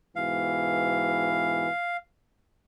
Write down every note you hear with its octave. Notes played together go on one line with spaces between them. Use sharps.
G#2 B2 E3 F5